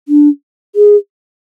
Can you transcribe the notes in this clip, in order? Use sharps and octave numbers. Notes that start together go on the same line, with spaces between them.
D4
G#4